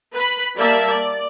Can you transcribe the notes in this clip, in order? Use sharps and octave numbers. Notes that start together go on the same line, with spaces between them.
B4 B5
G3 A#3 D5 E5 A5
D5